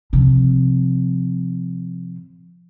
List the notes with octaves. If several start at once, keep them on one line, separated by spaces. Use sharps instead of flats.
C3 F3